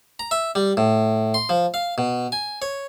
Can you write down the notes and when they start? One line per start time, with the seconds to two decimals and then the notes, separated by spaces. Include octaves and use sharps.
0.19 A#5
0.31 E5
0.55 G3
0.77 A2
1.34 C6
1.49 F3
1.74 F5
1.98 B2
2.32 G#5
2.62 C#5